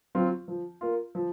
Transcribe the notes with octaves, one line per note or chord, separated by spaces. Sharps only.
F#3 C4 F4
F3
A#3 F4
F3